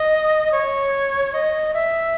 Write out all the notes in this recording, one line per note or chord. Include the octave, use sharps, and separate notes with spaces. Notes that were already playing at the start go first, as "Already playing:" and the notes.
Already playing: D#5
C#5
D#5
E5